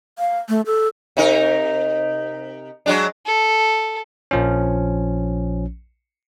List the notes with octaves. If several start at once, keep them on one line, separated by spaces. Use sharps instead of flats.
F5
A3
A4
C3 D#4 A#4
F#3 G#3 D4
A4
A#1 F3 C#4